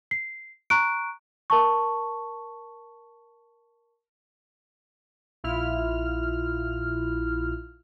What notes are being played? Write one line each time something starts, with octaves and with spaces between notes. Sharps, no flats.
C7
A#5 C#6 F#6 D7
A#4 A5 C#6
A#1 E4 F4 F6